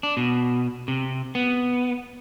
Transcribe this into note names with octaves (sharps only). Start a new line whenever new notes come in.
D4
B2
C3
B3